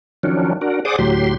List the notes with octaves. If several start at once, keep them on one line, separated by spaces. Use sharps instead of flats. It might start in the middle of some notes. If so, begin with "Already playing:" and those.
D#3 F3 F#3 C#4 D4
D4 F#4 A#4
G#4 C5 D5 F#5 D6 D#6
D2 A2 F#3 G4 C6